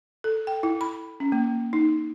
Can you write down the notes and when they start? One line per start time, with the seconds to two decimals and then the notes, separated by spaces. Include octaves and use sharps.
0.24 A4
0.47 G5
0.63 E4
0.81 B5
1.20 C#4
1.32 A#3
1.73 D#4